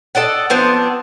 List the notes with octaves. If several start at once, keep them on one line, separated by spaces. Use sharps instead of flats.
A4 D5 D#5 F#5
F3 B3 C4 D4